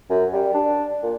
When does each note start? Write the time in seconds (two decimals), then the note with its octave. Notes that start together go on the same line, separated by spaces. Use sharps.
0.10 F#2
0.33 G3
0.54 D4
1.03 A#2